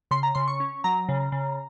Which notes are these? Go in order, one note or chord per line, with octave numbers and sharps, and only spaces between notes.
C#3 C6
A#5
C#3 C6
C#6
C#4
F#3 A#5
C#3
C#3